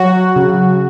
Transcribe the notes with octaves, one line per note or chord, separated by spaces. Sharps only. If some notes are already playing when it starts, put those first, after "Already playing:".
Already playing: F#3 F#4
C#3